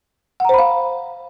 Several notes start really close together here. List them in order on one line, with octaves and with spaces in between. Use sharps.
F#5 A#5 C5 B5 F5